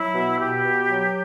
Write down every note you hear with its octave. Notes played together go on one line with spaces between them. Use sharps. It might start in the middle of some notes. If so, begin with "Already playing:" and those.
Already playing: F#3 E4
B2
B2 G4
B2
F#3